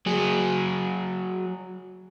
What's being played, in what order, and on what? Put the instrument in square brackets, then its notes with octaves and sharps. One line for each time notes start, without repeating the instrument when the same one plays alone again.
[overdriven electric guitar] F#3 G#4